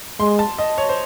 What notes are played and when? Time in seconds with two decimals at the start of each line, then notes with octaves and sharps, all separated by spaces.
0.20 G#3 C6
0.39 A5
0.59 D#5
0.78 C#5
0.89 C5